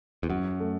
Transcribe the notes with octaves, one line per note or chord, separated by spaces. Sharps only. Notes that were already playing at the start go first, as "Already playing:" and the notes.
E2
F#2 F#4
A3